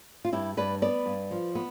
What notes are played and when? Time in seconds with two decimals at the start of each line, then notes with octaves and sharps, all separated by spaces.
0.25 F4
0.33 G2 E4 G4
0.57 G2 B4 D5
0.82 B3 B4 D5
1.06 G2
1.31 F3
1.55 B3